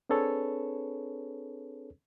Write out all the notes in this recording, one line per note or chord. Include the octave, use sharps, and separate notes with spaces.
C4 D4 G#4 A4 B4 C#5